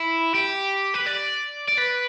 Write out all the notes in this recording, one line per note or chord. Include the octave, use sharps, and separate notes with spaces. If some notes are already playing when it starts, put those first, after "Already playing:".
Already playing: E4
G4
B4
D5
D5
B4